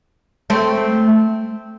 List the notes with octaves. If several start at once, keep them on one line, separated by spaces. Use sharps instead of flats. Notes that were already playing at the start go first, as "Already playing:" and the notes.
A3 C4